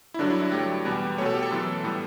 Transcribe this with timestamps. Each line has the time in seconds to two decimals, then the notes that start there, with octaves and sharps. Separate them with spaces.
0.14 E4
0.19 G2 D3 F#3 D4
0.30 E4
0.42 E4
0.52 G2 F#3 A3 G4
0.85 E2 B2 G3 B3
1.18 A3 C#5
1.21 B2 A4
1.34 G4
1.43 A4
1.51 F#2 E3 B3
1.84 A2 G3 B3